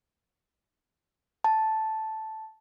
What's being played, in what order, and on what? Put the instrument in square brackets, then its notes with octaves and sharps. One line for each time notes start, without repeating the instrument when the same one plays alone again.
[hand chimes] A5